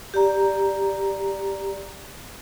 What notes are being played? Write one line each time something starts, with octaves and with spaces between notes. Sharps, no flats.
G4 D5 A#5